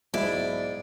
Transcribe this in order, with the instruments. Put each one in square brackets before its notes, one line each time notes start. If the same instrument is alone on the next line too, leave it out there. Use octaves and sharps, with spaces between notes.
[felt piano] B1 B5 [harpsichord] G#2 [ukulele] E4 [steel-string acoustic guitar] D5